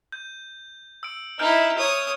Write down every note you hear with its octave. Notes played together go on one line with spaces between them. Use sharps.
G6
E6 D7
D#4 E4 F6 G6 D7
C#5 D#6